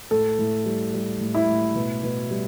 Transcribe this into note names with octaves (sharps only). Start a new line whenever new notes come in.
A2 A4
A2
G3
G3
A2
E4
A2
B2
B2
G3